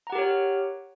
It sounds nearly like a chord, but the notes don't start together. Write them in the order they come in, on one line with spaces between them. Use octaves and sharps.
A#5 F#5 G4 A#4 C#5